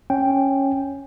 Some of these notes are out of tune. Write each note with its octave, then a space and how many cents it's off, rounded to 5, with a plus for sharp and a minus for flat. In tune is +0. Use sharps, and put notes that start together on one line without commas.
C#4 -10 G5 +0